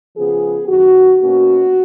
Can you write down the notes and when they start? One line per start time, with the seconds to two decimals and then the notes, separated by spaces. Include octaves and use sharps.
0.16 C#3 F3 B3 G#4
0.68 F#2 D#3 F#3 F#4
1.20 B2 A#3 C#4 F#4